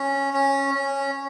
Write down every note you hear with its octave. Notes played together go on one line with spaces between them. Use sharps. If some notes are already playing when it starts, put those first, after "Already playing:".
Already playing: C#4
C#4
C#4